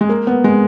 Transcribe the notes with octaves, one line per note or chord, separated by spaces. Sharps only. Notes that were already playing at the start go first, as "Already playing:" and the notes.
G#3
A#3
B3
G#3